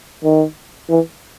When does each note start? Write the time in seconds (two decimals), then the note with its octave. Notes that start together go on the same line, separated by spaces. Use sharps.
0.24 D#3
0.90 E3